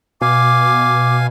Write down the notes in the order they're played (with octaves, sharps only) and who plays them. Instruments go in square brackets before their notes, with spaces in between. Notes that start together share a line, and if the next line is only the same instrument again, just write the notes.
[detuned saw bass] B2 [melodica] F5 G#5 [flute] D6